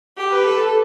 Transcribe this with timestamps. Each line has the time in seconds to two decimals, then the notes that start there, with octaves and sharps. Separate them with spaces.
0.16 G4
0.31 B4
0.46 A4